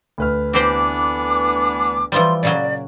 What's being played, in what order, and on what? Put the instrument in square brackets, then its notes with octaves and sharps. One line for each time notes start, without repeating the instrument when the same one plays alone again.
[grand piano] D2 B4 F6
[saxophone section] E3 B3 D4 [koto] C4 G4 C5 [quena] D6
[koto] E3 F3 G3 [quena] C6
[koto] A#2 C#3 F#3 [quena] D5